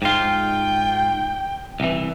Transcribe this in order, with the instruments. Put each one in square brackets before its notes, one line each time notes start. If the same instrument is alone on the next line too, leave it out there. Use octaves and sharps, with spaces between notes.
[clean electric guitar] G#2 F4 [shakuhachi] G5
[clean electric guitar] C2 E3